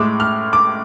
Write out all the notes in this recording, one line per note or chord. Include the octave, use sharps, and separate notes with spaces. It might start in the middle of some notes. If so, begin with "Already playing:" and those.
Already playing: A2 G#3 D6
F6
D6